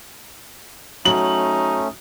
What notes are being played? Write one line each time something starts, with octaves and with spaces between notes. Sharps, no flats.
F#3 A3 C#4 D#4 F#7